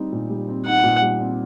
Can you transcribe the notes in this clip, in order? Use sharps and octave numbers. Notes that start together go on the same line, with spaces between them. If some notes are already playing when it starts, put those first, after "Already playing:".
Already playing: G3 C4 D#4
A#2
G3
C4
D#4 F#5
A#2
G3
C4